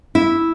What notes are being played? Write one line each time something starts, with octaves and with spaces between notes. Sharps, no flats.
E4